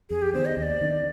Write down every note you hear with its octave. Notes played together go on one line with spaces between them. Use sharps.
F2 G#4
G4
D#3 B3 D4 C5
D#5
D#2 D#5
D5
D#3 B3 D4